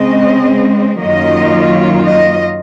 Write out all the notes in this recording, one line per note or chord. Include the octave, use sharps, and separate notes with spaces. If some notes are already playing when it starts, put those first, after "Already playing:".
Already playing: C#3 G#3 C4 D#5
F#2 D#3 F#3 A#3 F4 D#5
D#5